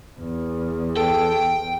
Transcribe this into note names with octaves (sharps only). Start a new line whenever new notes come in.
E2
A4 G5